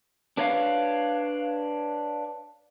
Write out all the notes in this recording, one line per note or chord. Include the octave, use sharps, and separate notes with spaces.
D4 B4 C#5 D#5 F5